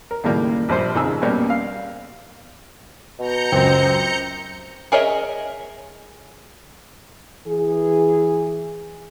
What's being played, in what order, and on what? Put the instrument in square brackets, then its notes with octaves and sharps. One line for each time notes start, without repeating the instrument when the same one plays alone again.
[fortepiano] A#4
D#2 A2 C#3 G3 A#3
A#1 G2 C5
F2 C#3 D#4 G#4 G#5 E6
B2 G3 A#3 B3 C#4
F5
[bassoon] B2 [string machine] A#5 G6 C#7
[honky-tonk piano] C#2 F#2 [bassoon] C4
[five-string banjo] G#4 A#4 C#5 D#5 E5
[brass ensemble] E3 G#4